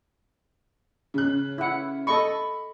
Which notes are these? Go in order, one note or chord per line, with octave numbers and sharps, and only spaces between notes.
C#3 F#6
E4 F#5
A4 D#5 B5 C#6